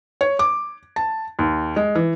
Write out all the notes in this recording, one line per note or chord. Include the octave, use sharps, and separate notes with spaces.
C#5
D6
A5
D#2
G#3
E3